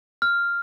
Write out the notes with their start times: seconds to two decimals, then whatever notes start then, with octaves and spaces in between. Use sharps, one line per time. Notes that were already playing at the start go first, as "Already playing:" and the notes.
0.22 F6